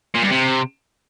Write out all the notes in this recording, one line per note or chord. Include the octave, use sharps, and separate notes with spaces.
A#2
G2
C3